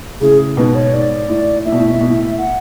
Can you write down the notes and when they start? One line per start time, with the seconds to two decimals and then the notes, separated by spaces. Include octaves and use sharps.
0.21 A2 C#3 G#4
0.57 G#2 B2 B4
0.75 C#5
0.93 G#2 D5
1.29 A2
1.65 A2 E5
1.72 B2
1.80 A2
1.88 B2
1.94 A2
2.01 B2
2.09 A2
2.38 F#5